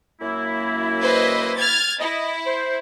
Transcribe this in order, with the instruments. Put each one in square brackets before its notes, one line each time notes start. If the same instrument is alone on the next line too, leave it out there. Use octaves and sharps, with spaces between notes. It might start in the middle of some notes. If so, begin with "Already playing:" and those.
[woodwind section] F#2 A#3 E4
[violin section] B4 C5 D#5
F6 G#6 A6
[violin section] E4 [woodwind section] D#5
[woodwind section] C5